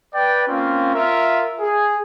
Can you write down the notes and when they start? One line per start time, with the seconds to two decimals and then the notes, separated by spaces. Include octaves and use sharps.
0.14 B4 D5 G5
0.48 A#3 C4 C#4 F4
0.95 F4 A#4 E5
1.60 G#4